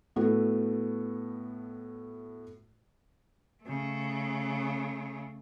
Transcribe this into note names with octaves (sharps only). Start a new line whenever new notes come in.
A2 A3 B3 E4 F#4 A4
C#3 A3